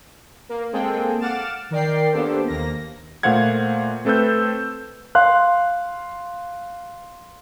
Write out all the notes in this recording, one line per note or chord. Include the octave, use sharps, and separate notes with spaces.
A#3
G#3 A#3 C4 G#4 A4 G5
F5 F#5 D6 F6 A6 E7
D#3 A#4 D5 G5 C7
A#3 B3 D4 G4 A4 C5
D#2 A#3 A#6
A#2 A3 C5 F5 F#5 G#6
A3 C4 A4 B4 E6 G6
F5 C6 F#6